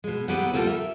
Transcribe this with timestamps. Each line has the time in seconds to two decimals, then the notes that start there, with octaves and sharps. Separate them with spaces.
0.04 B2 G#3
0.28 D#2 B3 E4 G4 B4 F#5
0.53 D2 G3 A#3 F4 A4 G5
0.67 E5